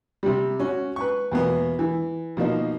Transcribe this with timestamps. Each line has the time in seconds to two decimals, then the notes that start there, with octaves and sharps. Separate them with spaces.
0.23 C3 G3
0.60 C#4 F#4
0.96 B4 C#6
1.32 E2 B2 A#3 B3
1.79 E3
2.37 B2 F3 A#3 D#4